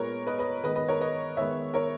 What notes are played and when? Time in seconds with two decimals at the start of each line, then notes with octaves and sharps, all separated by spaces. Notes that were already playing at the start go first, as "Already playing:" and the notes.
Already playing: A#2 G#3 B3 A#4 C#5
0.27 B4 D#5
0.39 B4 D#5
0.63 D#3 G#3 B3 B4 D#5
0.76 B4 D#5
0.88 A#4 C#5
1.01 B4 D#5
1.37 D#3 G#3 B3 C#5 E5
1.74 A#4 C#5